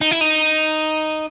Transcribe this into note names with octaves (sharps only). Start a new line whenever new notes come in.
D#4
E4
D#4